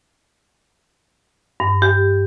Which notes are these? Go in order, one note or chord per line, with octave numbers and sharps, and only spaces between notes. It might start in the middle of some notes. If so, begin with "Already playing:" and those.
G2
G4